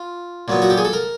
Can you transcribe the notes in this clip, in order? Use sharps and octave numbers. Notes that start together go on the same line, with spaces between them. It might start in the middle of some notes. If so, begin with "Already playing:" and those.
Already playing: F4
A#2 F#3 B3
F#4
G4
G#4
A4
A#4